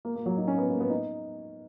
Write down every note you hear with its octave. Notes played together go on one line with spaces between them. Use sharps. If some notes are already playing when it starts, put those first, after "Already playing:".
A#3
A#3
F#3
D#4
C#4
B3
A#3
B3
D#4